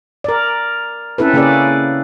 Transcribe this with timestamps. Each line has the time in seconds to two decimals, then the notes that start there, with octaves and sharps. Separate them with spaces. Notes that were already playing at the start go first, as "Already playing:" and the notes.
0.24 A#4 D5
1.18 C4 C#4 E4 A4 B4
1.33 C#3 A#3 C#4 G#4 B4 D5